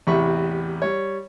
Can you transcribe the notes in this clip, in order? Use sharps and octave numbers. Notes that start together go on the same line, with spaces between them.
A1 E2 C3 E5 B5 C#6
G3 C#5